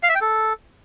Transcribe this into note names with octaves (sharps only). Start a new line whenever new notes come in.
F5
E5
G5
A4